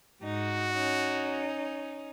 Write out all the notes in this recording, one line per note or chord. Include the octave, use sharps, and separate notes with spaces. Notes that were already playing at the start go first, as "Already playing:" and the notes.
G#2 D#4 F#4
C#4 D#4